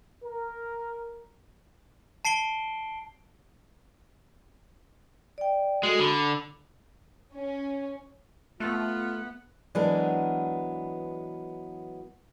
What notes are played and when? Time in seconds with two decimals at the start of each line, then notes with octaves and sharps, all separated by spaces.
0.24 A#4
2.25 A5 C7 D7 G7
5.38 D5 G5
5.83 G#3 F#4 A4
5.99 D3 B5
7.34 C#4
8.60 A3 B3 F4 F#6
9.75 E3 F#3 G#3 B3 D4 A#4